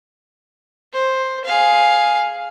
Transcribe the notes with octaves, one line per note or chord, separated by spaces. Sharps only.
C5
G#4 F5